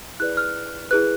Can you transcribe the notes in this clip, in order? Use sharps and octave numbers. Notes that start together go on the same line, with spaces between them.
E4 G#4 B4 D5 F#6
F6
E4 G#4 B4 F#6